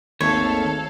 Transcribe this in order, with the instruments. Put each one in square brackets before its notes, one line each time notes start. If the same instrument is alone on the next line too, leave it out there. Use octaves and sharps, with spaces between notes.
[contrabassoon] G#1 [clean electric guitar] D#2 A3 [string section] A4 F5 [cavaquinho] C#5